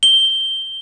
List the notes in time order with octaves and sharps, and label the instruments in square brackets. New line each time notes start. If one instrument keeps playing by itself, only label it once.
[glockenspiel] G7